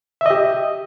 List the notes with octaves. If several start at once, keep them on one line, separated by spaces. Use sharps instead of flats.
G4 D#5 E5